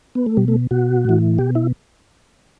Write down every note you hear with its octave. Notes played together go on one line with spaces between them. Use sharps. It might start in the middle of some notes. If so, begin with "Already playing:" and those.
B3
A3
B2 G3
A3
B2 F#4
A2 E3
B2 G4
E4